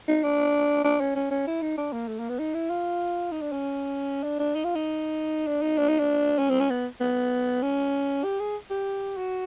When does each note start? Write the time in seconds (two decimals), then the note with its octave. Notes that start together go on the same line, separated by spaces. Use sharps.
0.08 D#4
0.24 D4
0.84 D4
1.01 C#4
1.15 C#4
1.31 C#4
1.47 E4
1.62 D#4
1.78 D4
1.92 A#3
2.08 A3
2.19 A#3
2.29 B3
2.39 D#4
2.54 E4
2.70 F4
3.32 D#4
3.41 D4
3.52 C#4
4.23 D4
4.39 D4
4.55 D#4
4.64 F4
4.75 D#4
5.47 D4
5.62 D#4
5.78 D4
5.89 D#4
5.99 D4
6.39 C#4
6.50 C4
6.60 C#4
6.70 B3
7.01 B3
7.62 C#4
8.24 G4
8.40 G#4
8.70 G4
9.17 F#4